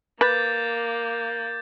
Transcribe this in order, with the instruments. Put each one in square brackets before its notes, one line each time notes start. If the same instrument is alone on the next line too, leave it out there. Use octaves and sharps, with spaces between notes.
[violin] A#3 [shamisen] B4 [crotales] D6 G6 A6